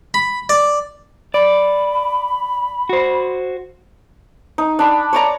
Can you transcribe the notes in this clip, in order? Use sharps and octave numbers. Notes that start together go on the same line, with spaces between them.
B5
D5
D5 B5
F#4 C5
D#4
D4 B5
C#5 D5 A#5